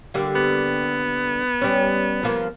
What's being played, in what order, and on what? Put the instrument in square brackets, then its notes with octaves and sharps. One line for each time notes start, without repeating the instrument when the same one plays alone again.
[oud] D3 G3 A#3
[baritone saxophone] B3
[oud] G3 C#4
F3 A#3 F4